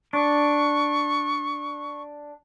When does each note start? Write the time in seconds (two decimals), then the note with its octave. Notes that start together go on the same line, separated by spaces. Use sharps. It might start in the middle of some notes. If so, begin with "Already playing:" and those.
0.13 D4 C#6